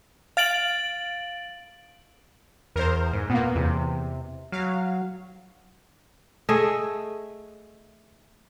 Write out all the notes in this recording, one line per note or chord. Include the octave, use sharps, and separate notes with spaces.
F5 A6 D7 F#7
E2 A#4 C5
G#2
A#2 A#3 B3
E2 C3
F#3 F5
A3 G#4 D#5 E5